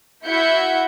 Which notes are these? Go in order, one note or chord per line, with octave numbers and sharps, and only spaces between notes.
E4 F#4 E5 F#5 G6 C#7